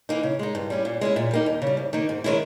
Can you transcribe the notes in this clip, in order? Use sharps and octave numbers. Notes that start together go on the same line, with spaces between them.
E3 A#3 D#4
C#3
G#3 D#4
G2
G3 C#4 E4
A#2
G#3 C#4 E4
A#2
G3 A#3 D#4
D#2
C#3 G3
G#2
D#3 A#3 D#4
G#2
D#3 G#3 C#4 E4